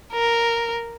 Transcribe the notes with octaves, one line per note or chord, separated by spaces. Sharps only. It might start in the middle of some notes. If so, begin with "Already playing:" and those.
A#4